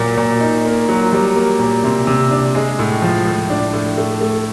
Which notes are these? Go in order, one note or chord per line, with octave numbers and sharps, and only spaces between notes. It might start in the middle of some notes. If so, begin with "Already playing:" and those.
Already playing: A#2 F#3 A#3
A#2
D#4
A#3
F#3
G3
A#3
A#2
C3
C3
D4
G#3
A2
F3
A2
D4
A2
A3
A3